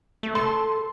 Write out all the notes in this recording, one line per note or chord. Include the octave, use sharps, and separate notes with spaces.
A3
A4 C6